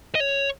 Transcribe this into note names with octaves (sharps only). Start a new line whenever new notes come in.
D#5
C#5